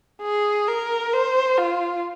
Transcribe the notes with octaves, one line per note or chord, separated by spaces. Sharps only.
G#4
A#4
C5
F4